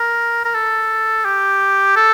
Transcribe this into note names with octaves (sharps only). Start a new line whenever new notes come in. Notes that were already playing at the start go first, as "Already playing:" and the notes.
Already playing: A#4
A#4
A4
G4
A4